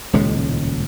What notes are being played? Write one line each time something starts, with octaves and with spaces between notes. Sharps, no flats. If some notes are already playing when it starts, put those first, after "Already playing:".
D#1 C#2 A2 G#3